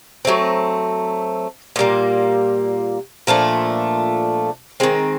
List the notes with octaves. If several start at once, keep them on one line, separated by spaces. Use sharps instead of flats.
F#3 A3 C4
A#2 G3 A#3
A#2 F3 A3 D4
D#3 G#3 C4